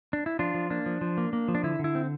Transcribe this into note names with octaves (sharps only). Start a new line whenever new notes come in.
D4
E4
F3 D4 F4
F3
A#3 D4
F3
F3
A#3
A#3
F3
D4
D3 E4
D3 E4
C4